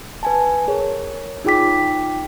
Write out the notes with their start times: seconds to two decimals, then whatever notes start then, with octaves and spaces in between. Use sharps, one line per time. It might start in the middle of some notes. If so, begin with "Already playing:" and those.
0.23 B4 G#5 A5
0.68 G#4 A#4 C#5
1.45 D#4 F4 G#4 G5 D6 B6